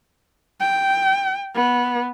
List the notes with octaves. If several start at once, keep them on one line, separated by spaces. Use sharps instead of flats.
G5
B3